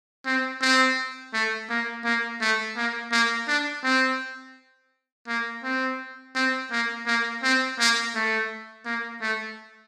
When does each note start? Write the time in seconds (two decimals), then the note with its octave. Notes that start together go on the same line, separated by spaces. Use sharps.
0.26 C4
0.61 C4
1.33 A3
1.70 A#3
2.05 A#3
2.41 A3
2.77 A#3
3.12 A#3
3.48 D4
3.84 C4
5.28 A#3
5.63 C4
6.35 C4
6.71 A#3
7.06 A#3
7.43 C4
7.79 A#3
8.15 A3
8.85 A#3
9.21 A3